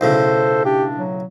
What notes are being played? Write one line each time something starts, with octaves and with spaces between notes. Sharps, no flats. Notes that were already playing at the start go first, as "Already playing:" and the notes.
B1 A2 C#3 A4 C5
D4 G4
F#3